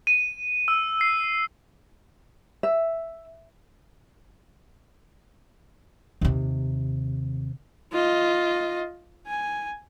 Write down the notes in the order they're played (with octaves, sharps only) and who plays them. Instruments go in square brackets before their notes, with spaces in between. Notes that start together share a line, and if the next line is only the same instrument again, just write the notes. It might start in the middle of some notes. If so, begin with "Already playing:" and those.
[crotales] D#7
E6
C7
[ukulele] E5
[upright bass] D#2 C3
[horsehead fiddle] F4 D#5
G#5